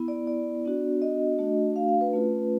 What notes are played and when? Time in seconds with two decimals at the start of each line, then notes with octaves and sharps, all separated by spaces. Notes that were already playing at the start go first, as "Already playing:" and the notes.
Already playing: B3 E4
0.08 D5
0.27 D5
0.65 B3 D4 F#4
1.02 D#5
1.39 A3 D4 F#4
1.76 F5
1.88 F5
2.01 B4
2.13 A3 C#4 F4